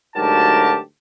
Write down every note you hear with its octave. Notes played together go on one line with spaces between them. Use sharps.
D2 G#2 F#3 G4 A#4 A5